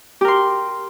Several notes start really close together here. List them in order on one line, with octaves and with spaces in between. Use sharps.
G4 A#4 C6